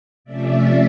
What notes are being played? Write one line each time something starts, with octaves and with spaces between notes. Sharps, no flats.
C3 F3 A3 C#4 D5 E5